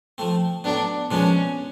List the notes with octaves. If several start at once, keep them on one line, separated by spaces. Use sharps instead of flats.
F3 A3 C4
A2 F#3 B3 D4
A#2 F3 G#3 B3 C#4 D4